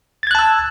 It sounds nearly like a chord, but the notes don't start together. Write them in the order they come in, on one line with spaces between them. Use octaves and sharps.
A6 G#6 F#6 A5 E6